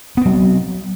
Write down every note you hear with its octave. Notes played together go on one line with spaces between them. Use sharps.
F#3 B3 C4